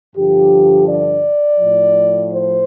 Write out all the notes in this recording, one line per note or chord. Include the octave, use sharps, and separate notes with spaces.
G2 D3 F3 G4
D5
A2 F3
C5